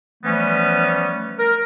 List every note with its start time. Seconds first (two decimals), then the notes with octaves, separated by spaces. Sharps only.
0.24 E3 F3 G3 A3 B3 C#4
1.38 A#4